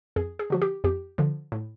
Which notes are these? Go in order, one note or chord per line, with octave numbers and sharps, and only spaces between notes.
F2 G#4
G#4
D3 F3 F#4
G4
F2 G4
D3 F3
A2